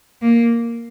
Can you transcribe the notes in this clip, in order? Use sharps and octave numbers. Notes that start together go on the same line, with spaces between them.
A#3